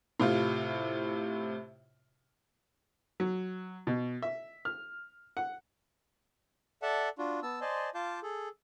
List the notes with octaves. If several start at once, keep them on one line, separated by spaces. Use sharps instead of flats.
A2 C3 F4
F#3
B2
E5
F6
F#5
A4 D5 E5 F#5 A5
D4 F4 F#4
B3 A5 E6
C5 D5 D#5 G#5 A5 C6
F4 F5 A5 D6 G6
G#4 A4